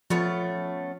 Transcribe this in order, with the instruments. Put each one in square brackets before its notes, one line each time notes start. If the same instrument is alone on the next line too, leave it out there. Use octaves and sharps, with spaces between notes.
[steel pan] F3 [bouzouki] A3 B3 C#4